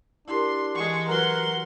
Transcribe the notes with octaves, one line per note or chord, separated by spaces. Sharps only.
D4 E4 G4 A#4 C6
E3 G#3 C#6
F#3 A#4 B4 F#5 C6 F6 F#6